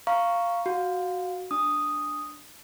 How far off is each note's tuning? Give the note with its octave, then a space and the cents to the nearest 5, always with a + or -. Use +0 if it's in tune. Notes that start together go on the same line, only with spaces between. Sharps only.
F5 -5 A#5 +0 C#6 +0
F#4 +0 F5 +15
D4 +0 D#6 +0